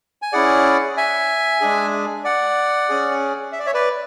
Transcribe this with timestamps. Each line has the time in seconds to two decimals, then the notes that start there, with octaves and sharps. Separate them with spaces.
0.22 G#5
0.33 C#4 E4 G#4 D5 F#5
0.97 E5 G#5
1.61 G#3 D4 G#4
2.24 D5 F#5
2.89 C#4 G#4
3.52 E5
3.59 D5
3.66 C#5 E5
3.74 B4 D5